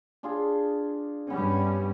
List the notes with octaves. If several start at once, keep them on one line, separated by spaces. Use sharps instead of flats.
D4 F4 G#4
G2 G3 B3 C#4